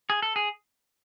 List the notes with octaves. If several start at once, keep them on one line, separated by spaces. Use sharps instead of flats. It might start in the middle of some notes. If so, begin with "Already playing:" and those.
G#4
A4
G#4